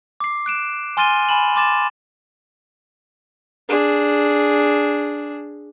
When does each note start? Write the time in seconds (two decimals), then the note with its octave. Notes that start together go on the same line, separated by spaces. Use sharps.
0.20 D6 C7
0.46 F#6 D7 E7
0.97 G#5 C6 F6 A6 D#7 G7
1.29 G#5 B5 E7 F#7
1.56 C6 D6 A6 E7
3.68 D4 G#4